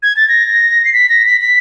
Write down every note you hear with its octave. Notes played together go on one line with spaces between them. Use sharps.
G#6
A6
A#6
C7
B6
A#6
B6
B6